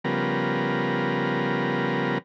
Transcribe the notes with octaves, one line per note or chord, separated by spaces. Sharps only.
C#3 F3 G3 B3 A#4